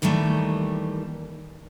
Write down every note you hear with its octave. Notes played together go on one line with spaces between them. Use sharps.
D#2 D#3 E3 G3 A3